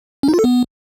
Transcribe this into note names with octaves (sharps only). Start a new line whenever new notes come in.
C#4
D#4
F4
A4
B3